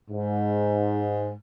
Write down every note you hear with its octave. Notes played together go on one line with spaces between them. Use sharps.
G#2